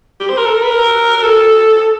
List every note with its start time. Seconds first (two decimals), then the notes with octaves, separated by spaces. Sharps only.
0.20 G4
0.30 C5
0.37 A#4
0.47 A4
0.54 A#4
0.63 B4
0.70 A#4
1.23 A4